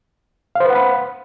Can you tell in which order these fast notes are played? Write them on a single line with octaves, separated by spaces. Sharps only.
F5 C5 B4 F#5 B5